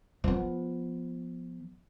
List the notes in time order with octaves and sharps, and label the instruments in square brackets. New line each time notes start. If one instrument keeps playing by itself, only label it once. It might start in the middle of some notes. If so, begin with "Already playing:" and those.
[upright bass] F3 B3